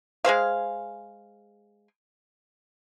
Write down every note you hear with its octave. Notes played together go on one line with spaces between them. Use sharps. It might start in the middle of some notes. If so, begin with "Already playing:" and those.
G#3 G#4 C5 F5